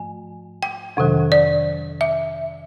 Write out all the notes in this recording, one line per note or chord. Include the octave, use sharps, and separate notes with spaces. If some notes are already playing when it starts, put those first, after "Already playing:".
Already playing: G#2 F3 A3 G#5
G5
F2 C3 D#3 F#3
D5
E5